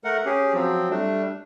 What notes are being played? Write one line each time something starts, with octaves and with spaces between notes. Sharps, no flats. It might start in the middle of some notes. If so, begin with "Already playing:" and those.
A3 A#4 F#5
C#4 G4 G#4
F3 F#3 C4
G3 A3 D4